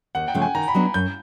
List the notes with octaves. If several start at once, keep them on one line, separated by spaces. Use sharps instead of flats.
D#2 F#5
G5
C#3 F3 A3 C#4
G#5
D#3 A#5
B5
F#3 B3 D4
F#2 G6